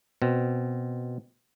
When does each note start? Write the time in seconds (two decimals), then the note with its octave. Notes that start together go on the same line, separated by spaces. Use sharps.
0.22 B2 C4